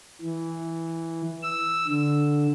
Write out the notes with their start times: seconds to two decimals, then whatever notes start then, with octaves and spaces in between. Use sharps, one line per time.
0.22 E3
1.43 E6
1.88 D3